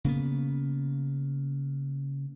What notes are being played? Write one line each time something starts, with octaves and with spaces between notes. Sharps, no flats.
C#3 A#3 B3